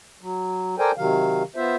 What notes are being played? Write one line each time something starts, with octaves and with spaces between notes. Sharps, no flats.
F#3
A4 A#4 C5 D5 G5 G#5
C3 D#3 F#3 F5
B3 F4 C5 E5